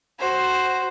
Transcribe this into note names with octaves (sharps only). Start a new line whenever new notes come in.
F#4 C5